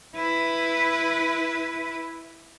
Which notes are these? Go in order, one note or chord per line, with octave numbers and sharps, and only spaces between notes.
E4 B4